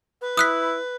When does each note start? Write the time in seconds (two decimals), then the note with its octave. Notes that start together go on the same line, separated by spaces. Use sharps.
0.21 B4
0.37 E4 D#6 F#6 B6